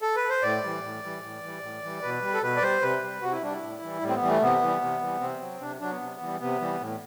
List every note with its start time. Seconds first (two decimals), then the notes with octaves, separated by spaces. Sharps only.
0.02 A4
0.16 B4
0.30 C5
0.43 A2 D5
0.63 E3 G3
0.83 A2
1.04 E3 G3
1.22 A2
1.43 E3 G3
1.63 A2
1.83 E3 G3
2.02 B2 B4
2.22 G3
2.34 A4
2.42 B2 B4
2.57 D5
2.62 G3 C5
2.82 C3 B4
3.02 G3
3.22 C3 F#4
3.32 E4
3.43 G3 D4
3.53 E4
3.62 A2
3.82 E3 G3
4.01 A2 G3
4.09 C4
4.15 B3
4.22 E3 G3
4.29 A3
4.42 C3 B3
4.61 E3 G3
4.82 C3
5.01 E3 G3
5.21 C3 C4
5.41 F#3
5.61 C3 D4
5.81 F#3 D4
5.91 B3
6.00 C3
6.21 E3 G3
6.40 C3 B3
6.61 E3 G3
6.80 A2